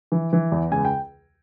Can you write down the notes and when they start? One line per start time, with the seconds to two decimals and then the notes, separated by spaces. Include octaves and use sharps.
0.12 E3
0.33 E3
0.52 E2
0.71 C#2 G#5
0.85 G5